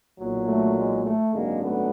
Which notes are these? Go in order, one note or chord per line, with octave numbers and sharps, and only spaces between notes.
B1 A#2 F#3
A3
G#3
A3
G#1 F#2 D3 F#3 G#3 A#3
A3 B3